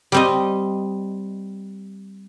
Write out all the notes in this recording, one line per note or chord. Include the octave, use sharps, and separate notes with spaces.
G3 C4 D#5